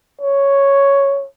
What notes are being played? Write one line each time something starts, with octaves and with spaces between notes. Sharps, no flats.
C#5